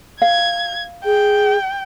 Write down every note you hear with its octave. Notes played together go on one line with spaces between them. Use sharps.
F5 G#6
G#4 G5